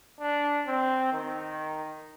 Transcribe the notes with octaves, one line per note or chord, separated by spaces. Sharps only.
D4
C4
D#3